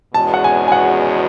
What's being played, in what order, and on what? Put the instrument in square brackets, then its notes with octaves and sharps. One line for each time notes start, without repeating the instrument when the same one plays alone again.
[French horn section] E2 B2 G#3 C#4 F#4 [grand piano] A5
[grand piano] F#5
G#5
G#5
F#5